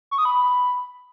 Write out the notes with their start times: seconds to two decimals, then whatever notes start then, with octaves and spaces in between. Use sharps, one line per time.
0.11 C#6
0.18 D#6
0.25 B5